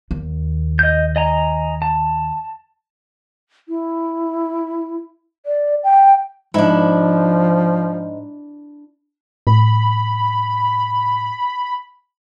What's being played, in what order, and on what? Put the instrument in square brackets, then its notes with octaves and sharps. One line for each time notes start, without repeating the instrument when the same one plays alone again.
[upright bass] D#2
[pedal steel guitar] D#5 G6
D#5 G#5 A#5
A5
[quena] E4
D5
G5
[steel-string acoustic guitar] G#2 [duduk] F3 [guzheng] D4 E4
[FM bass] A2 [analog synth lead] B5